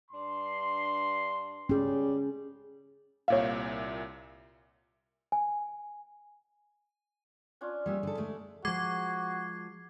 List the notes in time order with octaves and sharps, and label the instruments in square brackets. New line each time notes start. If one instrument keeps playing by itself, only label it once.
[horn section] G2 D4 C6
[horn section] A2 G3 G5 [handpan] C#4 G#4
[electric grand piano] C2 A#2 E5 [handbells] C#5 F5
[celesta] G#5
[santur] C#4 D4 F4
[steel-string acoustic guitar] G3 A#3 C#4 [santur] G#4 E5
[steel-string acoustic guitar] D3 A4
G#3 A3
[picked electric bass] F3 G#3 [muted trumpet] F#4 [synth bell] D6 G#6 C7